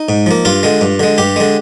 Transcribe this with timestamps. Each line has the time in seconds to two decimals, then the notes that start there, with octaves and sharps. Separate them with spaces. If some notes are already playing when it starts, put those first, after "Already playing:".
Already playing: D#4
0.09 G#2
0.26 F3 A#3
0.45 G2 F4
0.63 D3 G#3
0.81 G2
1.00 D3 G#3
1.18 G2 G4
1.36 D3 G#3